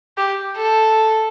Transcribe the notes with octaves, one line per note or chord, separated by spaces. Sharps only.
G4
A4